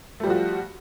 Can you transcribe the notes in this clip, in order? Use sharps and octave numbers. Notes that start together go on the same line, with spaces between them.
F3 G3 A3 F4 F#4